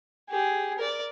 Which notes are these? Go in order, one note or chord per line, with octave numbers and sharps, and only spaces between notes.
G4 G#4
A#4 D5